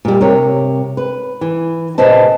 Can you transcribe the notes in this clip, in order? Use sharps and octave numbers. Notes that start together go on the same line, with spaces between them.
A#2 G3
C3 A#4 C#5
B4
E3
A#2 C#3 B4 C5 D#5 A5